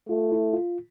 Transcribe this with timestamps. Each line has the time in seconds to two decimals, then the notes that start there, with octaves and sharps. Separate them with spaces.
0.09 A3 F4
0.32 E4
0.53 F4